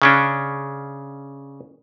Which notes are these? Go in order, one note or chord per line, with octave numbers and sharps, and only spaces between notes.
C#3 C#4 D4